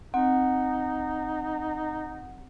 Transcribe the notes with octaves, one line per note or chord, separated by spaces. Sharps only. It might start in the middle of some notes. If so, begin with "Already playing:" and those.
C4 D#4 F#5